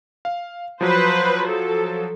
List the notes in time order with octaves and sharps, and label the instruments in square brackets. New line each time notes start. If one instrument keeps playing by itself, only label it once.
[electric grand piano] F5
[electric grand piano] F3 F#3 [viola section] B4 C5
[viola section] A4